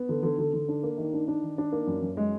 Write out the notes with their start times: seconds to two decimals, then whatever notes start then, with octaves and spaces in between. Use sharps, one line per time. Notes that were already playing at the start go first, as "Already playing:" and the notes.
Already playing: B3
0.09 D3
0.23 D3
0.39 D3
0.54 D3
0.68 D4
0.83 A#3
0.98 D#3
1.13 D4
1.28 D4
1.42 D#3
1.58 D4
1.72 A#3
1.87 F#2
2.02 F#2
2.17 G#3